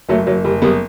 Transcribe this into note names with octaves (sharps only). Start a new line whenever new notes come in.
F#1 F#3 A3
F#1 F#3
F#1 G3
F#1 G3 B3